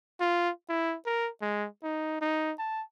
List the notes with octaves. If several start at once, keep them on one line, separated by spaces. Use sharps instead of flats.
F4
E4
A#4
G#3
D#4
D#4
A5